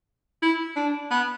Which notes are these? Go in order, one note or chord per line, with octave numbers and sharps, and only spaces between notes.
E4
D4
B3